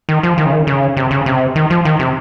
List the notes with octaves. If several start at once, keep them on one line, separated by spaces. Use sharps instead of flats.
D#3
F3
D#3
C#3
D#3
C#3
C3
C#3
C3
D#3
F3
D#3
C3